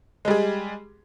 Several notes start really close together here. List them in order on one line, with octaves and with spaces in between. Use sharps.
G#3 G3 G#4